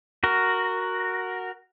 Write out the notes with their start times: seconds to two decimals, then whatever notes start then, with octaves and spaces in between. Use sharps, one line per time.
0.24 F#4 A#4